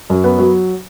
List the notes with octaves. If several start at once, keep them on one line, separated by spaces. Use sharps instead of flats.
F#2
B3
F#3